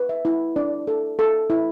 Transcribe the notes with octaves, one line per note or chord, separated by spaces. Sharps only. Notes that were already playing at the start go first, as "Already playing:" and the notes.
Already playing: B4
E5
E4
D4 D5
A4
A4
E4